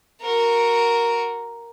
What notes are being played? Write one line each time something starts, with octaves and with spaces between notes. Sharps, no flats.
F#4 A#4